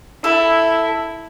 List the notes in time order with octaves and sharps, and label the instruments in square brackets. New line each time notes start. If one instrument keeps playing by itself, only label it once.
[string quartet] E4 [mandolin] A4